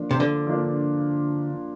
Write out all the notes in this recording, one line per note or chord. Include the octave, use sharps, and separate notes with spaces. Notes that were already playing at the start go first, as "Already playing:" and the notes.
Already playing: F3 A#3 D4
C3
D3
F3 A#3 D4